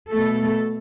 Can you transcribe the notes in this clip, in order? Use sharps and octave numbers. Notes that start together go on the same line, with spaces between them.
B2 A3 A4